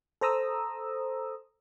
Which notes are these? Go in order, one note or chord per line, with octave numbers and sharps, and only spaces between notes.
A4 C5 A#5 D#6 E6